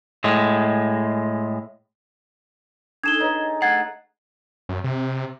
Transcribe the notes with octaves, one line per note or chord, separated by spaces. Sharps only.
A2 G#3
D4 D#4 G#4 A4 G#6 E7 G7
D#4 B4 C#5 D#5
A3 F#5 G#6 A6 C7
F#2
C3